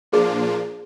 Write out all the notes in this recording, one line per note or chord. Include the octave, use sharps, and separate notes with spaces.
A#2 F3 A#3 D4 F4 G#4